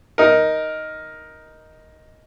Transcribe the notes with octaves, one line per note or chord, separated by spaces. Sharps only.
D#4 A#4